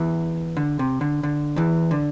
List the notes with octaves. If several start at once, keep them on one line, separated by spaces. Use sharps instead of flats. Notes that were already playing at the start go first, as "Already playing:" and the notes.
Already playing: E2 E3
D3
C3
D3
D3
E2 E3
D3